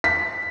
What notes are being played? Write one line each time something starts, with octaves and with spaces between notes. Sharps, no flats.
B6